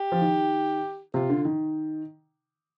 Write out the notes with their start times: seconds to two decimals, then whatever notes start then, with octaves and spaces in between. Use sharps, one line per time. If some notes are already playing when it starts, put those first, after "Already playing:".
Already playing: G4
0.12 F3
0.22 D#3
1.14 C3 F4
1.30 D3
1.45 D#3